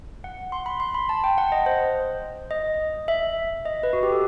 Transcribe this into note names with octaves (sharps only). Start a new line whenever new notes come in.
F#5
C6
B5
C6
B5
A5
G5
F#5
D#5
C5
D#5
E5
D#5
B4
F#4
G4
A4